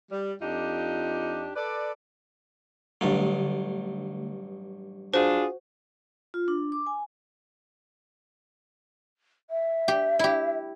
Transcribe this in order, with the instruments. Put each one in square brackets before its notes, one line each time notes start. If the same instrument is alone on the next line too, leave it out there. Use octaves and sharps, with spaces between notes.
[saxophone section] G3
F2 D4 D#4 F4 G4
A4 B4 D5
[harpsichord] A1 G2 F#3 [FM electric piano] D3 A3
[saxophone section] D4 F4 G#4 [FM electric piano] F#4 [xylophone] C5
[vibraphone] F4
D4
D6
G#5
[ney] E5
[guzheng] G4
E4 G4